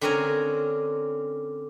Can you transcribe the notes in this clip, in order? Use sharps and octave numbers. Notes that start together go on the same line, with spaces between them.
D3 C4 C#4 A#4 G#5 A#5